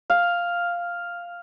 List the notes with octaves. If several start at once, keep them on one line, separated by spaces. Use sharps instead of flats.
F5